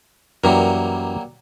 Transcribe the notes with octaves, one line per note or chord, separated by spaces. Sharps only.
F#2 E3 F#3 G3 A#3